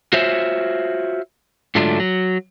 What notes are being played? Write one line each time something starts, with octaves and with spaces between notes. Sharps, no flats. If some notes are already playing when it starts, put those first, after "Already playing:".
F4 F#4 C5 C#5 E5
G#2 D3 F#3 A3 D4 F4
F#3